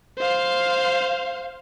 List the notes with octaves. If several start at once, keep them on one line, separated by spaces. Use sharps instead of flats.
C5 F5